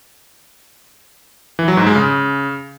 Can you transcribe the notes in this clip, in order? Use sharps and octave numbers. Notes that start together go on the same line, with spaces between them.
E3
F#3
G#2
G#3
C#3